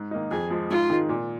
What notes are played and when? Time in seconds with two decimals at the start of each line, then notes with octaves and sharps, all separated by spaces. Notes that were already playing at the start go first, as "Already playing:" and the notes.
Already playing: G#2
0.11 D#3 A#3 D#4
0.31 F2 G#4
0.51 F3 G#3
0.70 G#2 F4
0.89 D#3 G#3
1.09 A#2